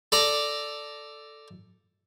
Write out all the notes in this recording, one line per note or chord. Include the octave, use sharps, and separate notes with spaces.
A4 D5 A#5